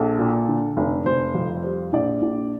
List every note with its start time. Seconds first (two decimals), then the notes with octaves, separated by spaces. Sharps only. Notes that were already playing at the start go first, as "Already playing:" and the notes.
Already playing: A#1 A4
0.19 A#2
0.48 D3
0.77 F1
1.06 F1 C5
1.35 F2
1.64 G3 C5
1.93 A#1 D5
2.22 A#1